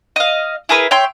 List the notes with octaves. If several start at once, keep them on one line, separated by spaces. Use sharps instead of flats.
D#5 F5
E4 G#4 A#4 B4
C#5 E5 G5 C6